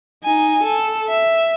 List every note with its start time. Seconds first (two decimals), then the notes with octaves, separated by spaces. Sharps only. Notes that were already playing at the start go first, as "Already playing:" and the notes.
0.24 D#4 G#5
0.63 A4
1.08 E5